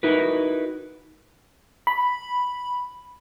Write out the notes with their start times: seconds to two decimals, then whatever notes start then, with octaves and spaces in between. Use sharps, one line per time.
0.03 D#4 E4 F#4 A#4 B4
1.87 B5